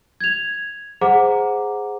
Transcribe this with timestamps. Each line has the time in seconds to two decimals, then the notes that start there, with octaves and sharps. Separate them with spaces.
0.20 G#6 F7
1.01 G#4 C5 F#5 A#5 D6